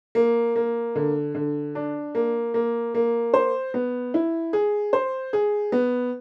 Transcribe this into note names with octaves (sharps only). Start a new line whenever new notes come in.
A#3
A#3
D3
D3
D4
A#3
A#3
A#3
C5
B3
E4
G#4
C5
G#4
B3